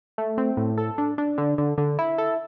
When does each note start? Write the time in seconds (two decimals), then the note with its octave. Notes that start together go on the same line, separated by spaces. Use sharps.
0.18 A3
0.38 C4
0.57 A2
0.78 A4
0.98 D4
1.18 D4
1.38 D3
1.58 D3
1.78 D3
1.99 E4
2.18 A4